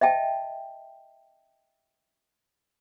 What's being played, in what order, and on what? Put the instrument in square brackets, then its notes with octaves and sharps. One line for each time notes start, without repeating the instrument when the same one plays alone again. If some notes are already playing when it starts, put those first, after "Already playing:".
[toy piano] D#5 E5 G5 A5